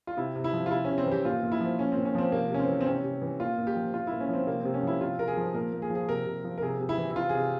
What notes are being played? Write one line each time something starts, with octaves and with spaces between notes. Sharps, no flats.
F4
C3 E4
C3
E4
F3
F4
C3 E4
C3 C#4
C4
E3
G4
A#2 F4
A#2
E4
F3
A#2 C#4
A#2 C4
C#4
F3 C4
C3 A#3
C3 C#4
C4
E3
C4
C3 C#4
C3
E3
A#2 F4
A#2
G4
F3
A#2 F4
A#2 E4
C#4
F3 C4
C3 A#3
C3 C4
C#4
F3 E4
C3 F4
C3 A#4
G#4
F3
A#2 A#4
A#2
G#4
F3
G#4
C3 A#4
C3
F3
A#4
C3 G#4
C3
E4
E3
E4
C3 F4
C3 G#4